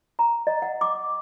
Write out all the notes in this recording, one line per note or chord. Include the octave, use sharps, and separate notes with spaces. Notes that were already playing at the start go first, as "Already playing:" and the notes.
A#5
D#5
F#5
D6